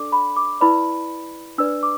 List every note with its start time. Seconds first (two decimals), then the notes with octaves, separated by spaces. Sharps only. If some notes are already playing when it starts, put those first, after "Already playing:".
Already playing: D4 A4 D5 D6
0.12 B5
0.36 D6
0.61 E4 B4 D5 B5
1.58 D4 B4 D5 E6
1.83 D6